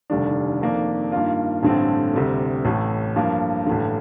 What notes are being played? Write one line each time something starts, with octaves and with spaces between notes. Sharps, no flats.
F1 D#2 D3 G3 D4
F2 D#3 A#3 D4
G2 D#3 A#3 F4
A1 G2 D3 A3 C4
D2 C3 G3
A1 A2 A3
G2 F3 A#3
A1 G2 D3